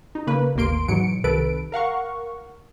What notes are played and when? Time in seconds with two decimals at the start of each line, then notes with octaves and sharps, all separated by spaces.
0.15 D#4
0.27 C#3 A#3 B4
0.55 G#1 D#2 A2 A#3 C6 D7
0.88 G#2 B2 E3 F#3 C#7 D7
1.24 C2 C3 D#3 A4 B4 D7
1.72 A#4 F5 F#5 C#6